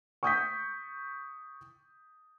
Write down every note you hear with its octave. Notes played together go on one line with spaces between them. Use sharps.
C#6 D#6 G6 B6